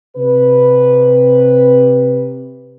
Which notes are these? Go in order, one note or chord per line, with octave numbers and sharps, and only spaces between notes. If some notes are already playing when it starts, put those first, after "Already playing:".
C3 B4